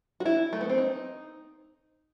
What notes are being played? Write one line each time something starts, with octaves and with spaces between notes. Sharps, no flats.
F#4
E4
A3
B3
C4
D#4